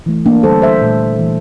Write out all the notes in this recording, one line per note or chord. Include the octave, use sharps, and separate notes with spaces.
E3 A3
A#3 D4
D3 G3 A#3 A4 C5
C5 E5
A#2 A3
E3 A3